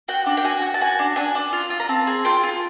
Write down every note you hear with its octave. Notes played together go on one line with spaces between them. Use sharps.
F#4 G5
D4
G5
F#4 G#5
F#4
A5
F#4 G#5
D4
D4 G#5
D4
F4
F4
A#5
C4 A5
G#4
F4 G5
F4